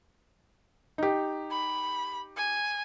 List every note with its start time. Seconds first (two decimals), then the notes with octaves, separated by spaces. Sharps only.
0.98 D#4 G4
1.51 B5
2.37 G#5